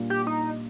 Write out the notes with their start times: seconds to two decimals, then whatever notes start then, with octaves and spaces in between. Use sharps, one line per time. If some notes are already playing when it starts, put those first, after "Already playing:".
Already playing: A#2 G3 A#3 D4 F4
0.10 G4
0.27 D#4